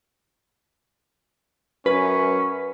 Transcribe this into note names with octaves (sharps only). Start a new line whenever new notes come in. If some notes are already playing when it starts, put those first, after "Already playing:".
F#2 C#4 B4